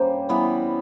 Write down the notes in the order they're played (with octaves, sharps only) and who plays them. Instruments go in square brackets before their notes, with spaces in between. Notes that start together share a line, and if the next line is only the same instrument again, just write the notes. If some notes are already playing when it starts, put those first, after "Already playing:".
Already playing: [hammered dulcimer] G3 A#3 C#4 [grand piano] C5
[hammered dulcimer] E3 G3 B3